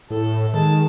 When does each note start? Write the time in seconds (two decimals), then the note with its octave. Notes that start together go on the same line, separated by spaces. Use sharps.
0.10 A2 A4
0.54 D#3 G#3 A5